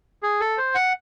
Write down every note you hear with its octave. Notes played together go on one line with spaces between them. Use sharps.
G#4
A4
C5
F#5